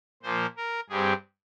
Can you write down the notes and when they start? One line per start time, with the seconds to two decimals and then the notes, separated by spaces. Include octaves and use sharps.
0.23 A#2 F3 A#3 C5
0.57 A#4
0.89 G2 G3 C4 G#4